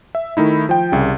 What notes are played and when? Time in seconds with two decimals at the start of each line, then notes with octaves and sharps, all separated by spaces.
0.15 E5
0.37 D#3 A3 D#4 E4
0.69 F3 G5
0.92 C2 C#3